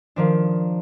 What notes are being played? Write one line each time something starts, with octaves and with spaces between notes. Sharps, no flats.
D#3 F3 D4